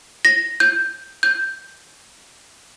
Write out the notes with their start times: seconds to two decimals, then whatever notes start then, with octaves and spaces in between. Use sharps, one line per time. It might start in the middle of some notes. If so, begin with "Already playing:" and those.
0.25 A#6
0.60 G6
1.23 G6